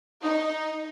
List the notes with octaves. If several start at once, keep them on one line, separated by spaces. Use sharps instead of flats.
D#4